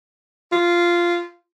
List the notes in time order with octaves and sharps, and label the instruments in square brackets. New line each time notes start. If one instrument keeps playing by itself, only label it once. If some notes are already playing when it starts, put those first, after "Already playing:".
[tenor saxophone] F4